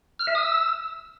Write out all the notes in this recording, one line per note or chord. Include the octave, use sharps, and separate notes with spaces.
F6
E5
D#6
E6